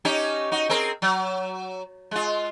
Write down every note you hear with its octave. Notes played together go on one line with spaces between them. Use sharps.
C#4 D#4 G4
D#4 F#4
C4 G#4 A#4
F#3
G#3 F4